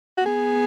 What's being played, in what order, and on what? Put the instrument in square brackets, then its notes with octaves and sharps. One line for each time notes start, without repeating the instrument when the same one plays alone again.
[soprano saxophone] F#4
[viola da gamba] B3 [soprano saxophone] G#4